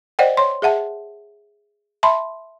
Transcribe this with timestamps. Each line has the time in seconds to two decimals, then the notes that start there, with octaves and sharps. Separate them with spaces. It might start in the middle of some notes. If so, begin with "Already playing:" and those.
0.19 C5 D5 D#5 F#5 G5
0.37 C#5 C6
0.62 G#4 E5 F#5 A5
2.03 E5 A5 B5 C6